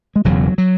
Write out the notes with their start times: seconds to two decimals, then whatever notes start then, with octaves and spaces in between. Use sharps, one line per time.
0.16 G#3
0.24 E1 E2 C#3 F#3
0.58 F#3